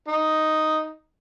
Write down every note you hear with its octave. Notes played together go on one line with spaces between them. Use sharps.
D#4